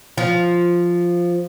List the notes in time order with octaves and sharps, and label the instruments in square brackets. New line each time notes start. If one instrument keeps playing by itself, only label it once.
[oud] F3